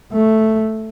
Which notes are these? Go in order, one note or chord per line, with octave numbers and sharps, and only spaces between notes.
A3